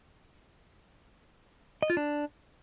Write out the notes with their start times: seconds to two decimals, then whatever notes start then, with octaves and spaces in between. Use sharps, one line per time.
1.82 D#5
1.90 F4
1.97 D4